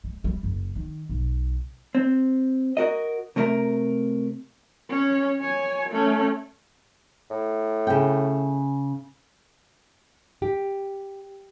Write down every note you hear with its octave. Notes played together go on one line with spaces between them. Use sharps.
G#3
G3
F#1
D#3
B1
C4
F#4 A#4 D#5
C3 A3 A#4 B4 E5 A#5
C#4 C#5
C#5 G#5
A3 C#4
A2
C#3 G5
G4